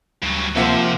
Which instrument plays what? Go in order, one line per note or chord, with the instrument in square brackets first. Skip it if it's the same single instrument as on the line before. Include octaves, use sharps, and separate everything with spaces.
[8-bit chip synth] D2 [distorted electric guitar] G2 F#3
[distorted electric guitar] C3 [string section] F3 [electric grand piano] A#3 E5 F#5